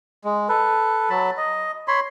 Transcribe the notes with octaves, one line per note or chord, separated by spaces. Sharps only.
G#3
A4 B4
F#3 A5 B5
D#5
C#5 B5 C6